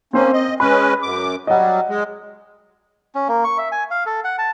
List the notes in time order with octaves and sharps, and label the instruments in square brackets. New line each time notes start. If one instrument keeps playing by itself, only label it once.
[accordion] A#3 C#4 [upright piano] C4 C5
[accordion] D#5
[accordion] G#3 C#4 B4 [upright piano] B5
[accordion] F#2 D6
[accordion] F#3 G3 [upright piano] D#5 F#5
[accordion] G#3
[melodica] C#4
A#3
C#6
E5
G#5
F5
A4
F#5
A5